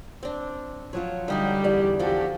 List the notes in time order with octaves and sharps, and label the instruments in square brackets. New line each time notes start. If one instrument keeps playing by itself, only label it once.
[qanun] C4 D4
[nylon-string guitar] F3 F#3 F4 [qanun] C#5
[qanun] D3 D#4 F#4 [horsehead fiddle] G3 G4
[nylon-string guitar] E2 D5
[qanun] F3 A4 [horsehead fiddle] F#4 G4